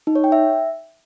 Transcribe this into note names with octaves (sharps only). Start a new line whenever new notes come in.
D#4
C#5
G5
E5